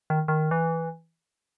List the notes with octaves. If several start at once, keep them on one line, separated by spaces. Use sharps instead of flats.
D#3
D#3
E3